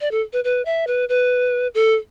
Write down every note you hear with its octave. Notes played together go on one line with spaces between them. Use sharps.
D5
A4
B4
B4
E5
B4
B4
A4